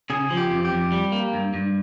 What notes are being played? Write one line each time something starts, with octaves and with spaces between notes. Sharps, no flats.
C#3 G#4
F3
G4
F2
G4
F2
G3
A#3
G2
G2